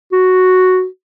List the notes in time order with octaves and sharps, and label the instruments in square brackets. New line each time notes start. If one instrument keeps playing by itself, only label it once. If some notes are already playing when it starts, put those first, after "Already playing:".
[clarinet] F#4